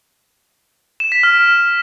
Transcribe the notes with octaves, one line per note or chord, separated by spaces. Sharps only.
E7
B6
F6